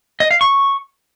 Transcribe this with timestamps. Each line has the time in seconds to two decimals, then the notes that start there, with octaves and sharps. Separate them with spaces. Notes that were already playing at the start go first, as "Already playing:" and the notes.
0.20 D#5
0.31 F5
0.41 C#6